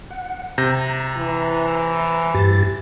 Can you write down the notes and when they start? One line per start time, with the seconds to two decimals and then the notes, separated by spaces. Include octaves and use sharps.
0.10 F#5
0.58 C3 A#5 G6 A#6
1.17 E3
2.34 G2 G4 A6